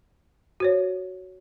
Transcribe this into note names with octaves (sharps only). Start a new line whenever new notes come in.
F#4 C5 C#5